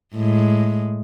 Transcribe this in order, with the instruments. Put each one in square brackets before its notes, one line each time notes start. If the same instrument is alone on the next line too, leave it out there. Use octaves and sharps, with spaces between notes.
[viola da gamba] A2 G#3